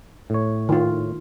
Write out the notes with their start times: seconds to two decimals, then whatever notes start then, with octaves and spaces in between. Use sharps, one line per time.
0.30 A2 C#5
0.69 D#3 F4